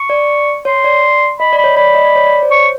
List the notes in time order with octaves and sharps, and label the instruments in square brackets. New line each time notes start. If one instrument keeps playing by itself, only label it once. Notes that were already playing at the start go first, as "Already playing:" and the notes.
Already playing: [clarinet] C#6
[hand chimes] D5
[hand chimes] C#5 [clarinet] C6
[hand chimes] D5
[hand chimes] D#5 [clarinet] B5
[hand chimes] D5
[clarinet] B5
[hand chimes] C#5
[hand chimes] D5 [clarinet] B5
[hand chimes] D#5
D5
C#5
D5
C5
[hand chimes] C#5 [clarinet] C#6